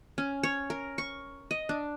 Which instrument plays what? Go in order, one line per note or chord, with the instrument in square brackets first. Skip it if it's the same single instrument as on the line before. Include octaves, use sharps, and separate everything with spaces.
[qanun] C#4
C#5
A#4
C#6
D#5
D4